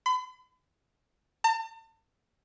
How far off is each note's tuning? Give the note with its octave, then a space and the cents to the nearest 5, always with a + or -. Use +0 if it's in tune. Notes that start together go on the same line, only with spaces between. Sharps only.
B5 +40
A5 +40